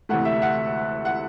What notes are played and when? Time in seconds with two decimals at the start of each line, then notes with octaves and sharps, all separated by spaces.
0.09 D2 C3 E3 A3 F#5
0.25 E5
0.42 F#5
1.05 F#5